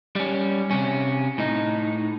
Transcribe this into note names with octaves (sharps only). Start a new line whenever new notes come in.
G3 C#4
C3 C#4
A2 D#4